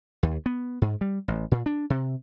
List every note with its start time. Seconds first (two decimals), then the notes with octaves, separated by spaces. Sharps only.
0.23 D#2
0.46 B3
0.82 G#2
1.01 G3
1.28 A1
1.51 A#2
1.66 D4
1.90 C3